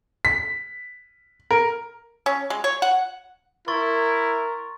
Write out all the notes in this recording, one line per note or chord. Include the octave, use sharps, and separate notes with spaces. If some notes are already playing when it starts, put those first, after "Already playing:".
B6
A#4
C#4
G#3
C#5
F#5
E4 A#4 C6 C#6 A6